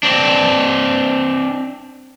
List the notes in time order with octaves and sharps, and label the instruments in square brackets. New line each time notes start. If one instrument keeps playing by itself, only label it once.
[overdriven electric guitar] C4 D4